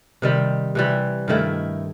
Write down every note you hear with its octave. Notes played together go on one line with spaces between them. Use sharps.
C3 D#3 G3
C3 E3 G3
G2 D#3 A3 E4